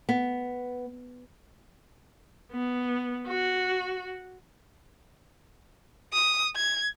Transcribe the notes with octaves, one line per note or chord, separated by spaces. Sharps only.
B3
B3
F#4
D#6
G#6